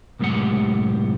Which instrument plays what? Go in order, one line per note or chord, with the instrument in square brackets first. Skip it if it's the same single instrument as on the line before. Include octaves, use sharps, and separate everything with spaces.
[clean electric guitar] C2 F#2 A2 G#3 G4 F#5